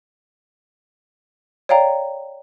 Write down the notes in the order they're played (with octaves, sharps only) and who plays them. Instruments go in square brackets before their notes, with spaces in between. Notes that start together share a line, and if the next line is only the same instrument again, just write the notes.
[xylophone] C#5 D5 F5 G5 A#5